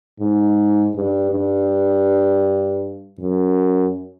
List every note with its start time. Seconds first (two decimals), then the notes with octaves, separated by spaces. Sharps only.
0.19 G#2
0.95 G2
1.32 G2
3.19 F#2